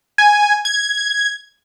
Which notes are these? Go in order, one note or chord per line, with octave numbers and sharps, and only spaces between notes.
G#5
G#6